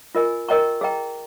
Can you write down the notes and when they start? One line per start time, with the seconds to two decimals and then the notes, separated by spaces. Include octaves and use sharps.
0.15 F4 A#4 D#5 G#5
0.49 A#4 D#5 G5 A#5 C#6
0.81 G#4 D#5 G5 A#5